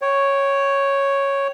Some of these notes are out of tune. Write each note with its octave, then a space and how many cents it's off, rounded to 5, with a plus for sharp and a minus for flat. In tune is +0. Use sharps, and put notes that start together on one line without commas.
C#5 +0 G5 -15